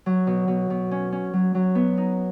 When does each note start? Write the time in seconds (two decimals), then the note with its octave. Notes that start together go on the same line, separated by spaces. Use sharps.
0.06 F#3
0.27 B2
0.48 B2
0.70 B2
0.91 C#4
1.12 C#4
1.33 F#3
1.55 F#3
1.75 B3
1.98 D#4